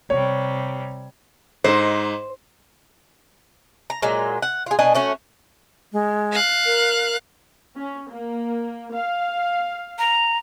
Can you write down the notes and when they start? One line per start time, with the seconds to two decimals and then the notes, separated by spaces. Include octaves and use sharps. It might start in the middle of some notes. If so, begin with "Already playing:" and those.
0.10 C3 G3 C#5
1.64 G#2 D#4 C5
3.90 A#5
4.02 A#2 F#3 G#3 A#5
4.42 F#5
4.66 F4 G#4
4.79 B2 D4 D#5 G#5
4.95 A3 C#4 F#4
5.93 G#3
6.32 F5 F#6
6.66 A#4
7.77 C#4
8.10 A#3
8.94 F5
9.99 A#5